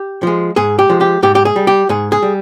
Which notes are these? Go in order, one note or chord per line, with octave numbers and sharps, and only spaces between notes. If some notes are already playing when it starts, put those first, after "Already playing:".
Already playing: G4
F3 G#3
G#2 G#4
G4
F3 G#3
G4
G#2 G4
G4
G#4
G3
G4
G#2 G#4
G#4
G3